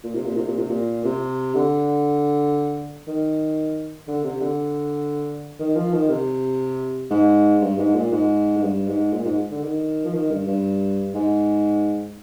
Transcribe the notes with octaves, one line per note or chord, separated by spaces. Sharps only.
A#2
C3
A#2
C3
A#2
C3
A#2
C3
D3
D#3
D3
C3
D3
D#3
F3
D#3
C3
G#2
G2
G#2
A#2
G#2
G#2
G2
G#2
A#2
G#2
D3
D#3
F3
D#3
G2
G2
G#2